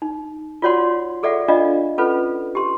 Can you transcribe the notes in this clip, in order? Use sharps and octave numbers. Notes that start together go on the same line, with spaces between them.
D#4
F4 F#4 C#5 D5 F#5 C6
G#4 A4 D5 E5 F#5
D4 F4 D5 D#5 F5
C#4 F4 A4 B4
G4 C6